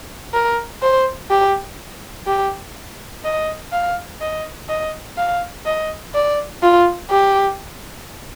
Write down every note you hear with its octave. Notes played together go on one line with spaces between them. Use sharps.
A#4
C5
G4
G4
D#5
F5
D#5
D#5
F5
D#5
D5
F4
G4